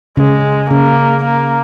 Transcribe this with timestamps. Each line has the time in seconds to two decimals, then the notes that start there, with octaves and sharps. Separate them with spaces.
0.17 C#3 G#3
0.70 C#3 A#3
1.24 A#3